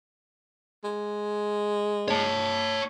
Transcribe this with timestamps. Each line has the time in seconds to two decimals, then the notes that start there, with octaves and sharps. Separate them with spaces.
0.84 G#3
2.08 C#5 A5